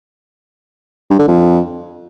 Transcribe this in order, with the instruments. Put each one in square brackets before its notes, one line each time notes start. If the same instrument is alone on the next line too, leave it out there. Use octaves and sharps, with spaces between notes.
[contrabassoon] G2
D3
F2